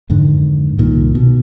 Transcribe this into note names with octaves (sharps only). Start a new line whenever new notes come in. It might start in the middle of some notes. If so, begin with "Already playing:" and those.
F2 G#2 D3 D#3
C2 A#2 D#3
B2